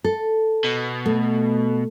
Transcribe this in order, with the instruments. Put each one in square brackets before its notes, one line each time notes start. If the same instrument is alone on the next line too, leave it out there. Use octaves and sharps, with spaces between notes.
[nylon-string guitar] A4
[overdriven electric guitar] B2
[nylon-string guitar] A3